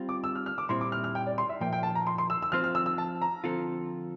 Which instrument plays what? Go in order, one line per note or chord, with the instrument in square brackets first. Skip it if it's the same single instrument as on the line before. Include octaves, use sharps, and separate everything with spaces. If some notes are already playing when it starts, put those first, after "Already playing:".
Already playing: [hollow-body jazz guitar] G3 C4 F4
[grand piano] D6
E6
F6
F6
D6
[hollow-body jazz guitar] A#2 G3 C4 E4 [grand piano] C6
[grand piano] D6
F6
F6
G5
D5
C6
E5
[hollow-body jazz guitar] A#2 F3 A#3 [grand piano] G5
[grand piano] G5
A5
A#5
C6
C6
E6
E6
[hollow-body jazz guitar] F3 C4 F4 C5 [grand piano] F6
[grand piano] F6
E6
E6
A5
A#5
[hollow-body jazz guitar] D3 F3 C4 F4 A4